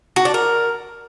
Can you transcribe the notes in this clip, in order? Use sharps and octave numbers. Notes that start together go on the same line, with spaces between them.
F#4
D4
A#4